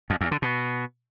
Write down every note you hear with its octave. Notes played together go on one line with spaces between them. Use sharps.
F2
E2
D3
B2